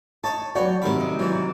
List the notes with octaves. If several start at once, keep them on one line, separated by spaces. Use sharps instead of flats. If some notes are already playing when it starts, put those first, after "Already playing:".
D#4 C#5 D#5 A5
F#3 B3 F#4 C#5 D5 F#5 G5
D#2 G#2 C3 D#3 G3 A#4 B5
D#4 D#5
G#2 E3 F#3